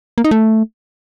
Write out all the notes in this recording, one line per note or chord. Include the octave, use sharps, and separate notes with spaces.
A#3
D#4
A3